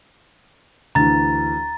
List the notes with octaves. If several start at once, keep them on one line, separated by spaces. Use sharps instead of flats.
D2 E3 A#5 A6